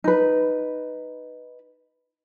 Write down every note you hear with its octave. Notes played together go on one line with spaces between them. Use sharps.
D#4 B4